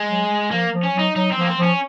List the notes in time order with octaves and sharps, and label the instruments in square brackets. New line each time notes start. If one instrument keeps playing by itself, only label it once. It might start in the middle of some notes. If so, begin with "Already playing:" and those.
Already playing: [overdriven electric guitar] G#3
[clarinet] F#3
[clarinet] F3 [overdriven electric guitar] A#3
[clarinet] F3
[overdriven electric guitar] C#4
[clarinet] F#3 [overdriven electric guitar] D#4
[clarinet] F#3 [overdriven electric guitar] D#4
[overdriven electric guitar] C4
[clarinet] F3 [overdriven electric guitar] A#3
[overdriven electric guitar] C4
[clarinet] F3
[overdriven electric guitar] C#4